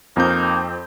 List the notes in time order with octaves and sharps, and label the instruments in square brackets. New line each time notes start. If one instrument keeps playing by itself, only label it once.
[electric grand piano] F2 C4 G6 [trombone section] A#3 D#4